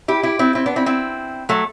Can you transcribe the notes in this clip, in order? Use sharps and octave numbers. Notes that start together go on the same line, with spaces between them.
E4 G4
E4 G4
C4 E4
C4 E4
B3 D4
C4 E4
C4 E4
F#3 A3